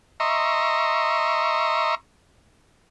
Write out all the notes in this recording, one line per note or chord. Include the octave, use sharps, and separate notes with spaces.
D#5 E5 A#5 C6 C#6